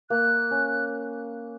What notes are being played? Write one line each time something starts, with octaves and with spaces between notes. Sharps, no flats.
A#3 F#6
C#4